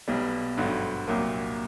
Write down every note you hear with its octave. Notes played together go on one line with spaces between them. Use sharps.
B1 B2 G3
G#1 G2 D3 F#3
C2 A#2 F#3 A#3